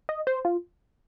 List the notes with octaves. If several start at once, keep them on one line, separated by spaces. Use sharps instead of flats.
D#5
C5
F4